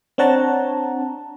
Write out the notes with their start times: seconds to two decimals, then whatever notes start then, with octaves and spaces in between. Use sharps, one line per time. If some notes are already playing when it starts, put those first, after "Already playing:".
0.18 C4 D4 C#5 F#5 A5 A#5